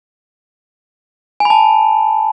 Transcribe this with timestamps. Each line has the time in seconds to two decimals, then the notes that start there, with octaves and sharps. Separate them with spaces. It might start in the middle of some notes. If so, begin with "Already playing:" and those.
1.40 G#5
1.45 B5
1.50 A5